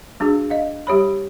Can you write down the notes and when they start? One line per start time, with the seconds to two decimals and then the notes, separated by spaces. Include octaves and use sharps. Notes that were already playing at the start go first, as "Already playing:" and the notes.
0.20 G#3 D4 F#4 G#4
0.50 D#5 F5
0.87 G3 G4 C#5 B5